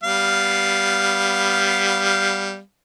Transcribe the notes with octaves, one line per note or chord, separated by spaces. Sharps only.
G3 B3 F5